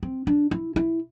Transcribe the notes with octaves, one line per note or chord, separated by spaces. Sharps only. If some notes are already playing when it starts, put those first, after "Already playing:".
C4
D4
E4
E4